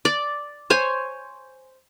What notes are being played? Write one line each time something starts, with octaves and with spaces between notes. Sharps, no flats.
D5
C5 C#5 G#5